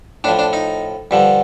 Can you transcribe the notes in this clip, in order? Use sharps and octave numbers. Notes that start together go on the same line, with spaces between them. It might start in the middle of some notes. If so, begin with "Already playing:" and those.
A2 F3 D4
D4
D#4
G2 D3 F3